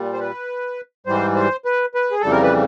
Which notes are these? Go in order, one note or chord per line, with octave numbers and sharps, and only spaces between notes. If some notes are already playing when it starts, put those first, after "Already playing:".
Already playing: A#2 G3
C5
B4
G#2 E3 G3 C5
C5
B4
B4
G#4
F2 C#3 E3 G3 A4
A#4
B4